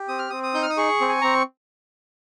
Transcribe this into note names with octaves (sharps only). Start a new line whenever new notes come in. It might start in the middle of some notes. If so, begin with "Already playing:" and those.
Already playing: G4
C4 D#6
F6
C4 D#6
D#6
D#4 G6
F6
D#6
G#4 C#6
C4
G#5
C4 A#5